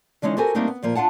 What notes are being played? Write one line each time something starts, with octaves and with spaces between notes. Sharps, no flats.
D3 E3 G#3 C#4 D#4
F#4 G4 A4 A#4 C5 G#5
G3 A3 A#3 C4 D4 D#4
B3
A#2 F3 A#3
D4 F4 F5 F#5 A5